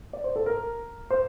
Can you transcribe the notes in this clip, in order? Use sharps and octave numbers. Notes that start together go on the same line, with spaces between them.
D5
C5
A4
A#4
C5